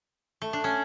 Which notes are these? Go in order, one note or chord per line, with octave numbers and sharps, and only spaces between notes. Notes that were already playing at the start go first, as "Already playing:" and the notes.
A3
D4
C#4